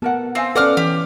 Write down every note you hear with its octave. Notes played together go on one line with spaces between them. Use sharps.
B3 A4 A#4 F#5
C4 C5 F5 G#5
C#4 A4 B4 D5 F#5 D6 F6
E3 G4